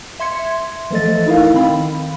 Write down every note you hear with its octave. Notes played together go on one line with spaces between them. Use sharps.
E5 C6 G#6 C#7
E3 F3 A3 A4 D#5 A6
D#4 E4 A#4 F5
D#3 C4 F5 B5